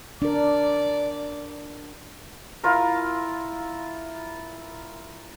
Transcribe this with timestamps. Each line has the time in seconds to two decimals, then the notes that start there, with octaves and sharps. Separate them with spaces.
0.22 D4 A#4 D5
2.63 E4 F4 A#4